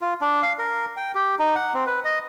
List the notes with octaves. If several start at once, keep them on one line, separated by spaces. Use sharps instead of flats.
F4
D4
F5
A#4
G5
G4
D#4
F#5
C4
B4
D#5